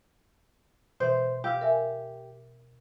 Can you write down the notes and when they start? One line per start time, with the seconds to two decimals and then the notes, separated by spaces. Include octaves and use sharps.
1.00 B2 E3 C5
1.44 G4 F5 E6 F6
1.61 A#4 E5 G#5